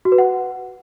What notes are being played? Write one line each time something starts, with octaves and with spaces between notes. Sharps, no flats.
F#4
B4
F#5